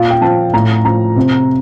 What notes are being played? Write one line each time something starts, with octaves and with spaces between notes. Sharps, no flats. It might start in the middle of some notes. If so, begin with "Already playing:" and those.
Already playing: A#2 F5
G5
F3 A5
A2 A#5
F3 A#5
C3